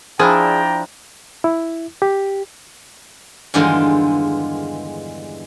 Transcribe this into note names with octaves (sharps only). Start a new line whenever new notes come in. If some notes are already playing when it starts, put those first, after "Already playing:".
F3 D4 E4 G#4 D5 G5 A#5
E4
G4
E2 G2 D3 D#3 G#3 F4